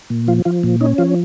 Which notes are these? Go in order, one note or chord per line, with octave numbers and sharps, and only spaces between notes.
A#2
F3 F4
F3 F4
A#2
C#4 D#4
F3 F4